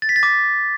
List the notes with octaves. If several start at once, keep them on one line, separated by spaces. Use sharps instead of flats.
A6
B6
A6
D6